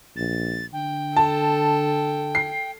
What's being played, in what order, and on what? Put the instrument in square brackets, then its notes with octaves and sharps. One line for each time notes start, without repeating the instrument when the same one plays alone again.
[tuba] A#1 [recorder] A6
[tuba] D3 [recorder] G5
[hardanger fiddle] A4 [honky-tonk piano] A5
[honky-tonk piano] C7